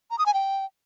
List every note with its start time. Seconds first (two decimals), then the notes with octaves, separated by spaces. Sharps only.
0.11 A#5
0.18 D#6
0.26 G#5
0.34 G5